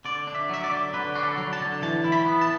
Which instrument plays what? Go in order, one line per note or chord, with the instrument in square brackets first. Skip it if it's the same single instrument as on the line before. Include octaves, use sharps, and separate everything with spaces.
[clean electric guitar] D3 D5
D4
E5
F#3 E5
D5
D3
D3 B4
D4 F#4
A4
F#3
A5
D3
E3 A5
E4
B5
B3
A5